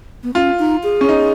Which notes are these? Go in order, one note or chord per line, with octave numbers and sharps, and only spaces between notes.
B3
C#4 F4
D#4
G#4
C#4
D#4